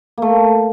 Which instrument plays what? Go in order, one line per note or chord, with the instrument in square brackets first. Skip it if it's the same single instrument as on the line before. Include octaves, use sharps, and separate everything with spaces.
[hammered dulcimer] A3 A#3